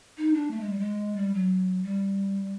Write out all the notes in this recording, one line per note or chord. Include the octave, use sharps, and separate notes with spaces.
D#4
D4
A3
G#3
G3
G#3
G3
F#3
G3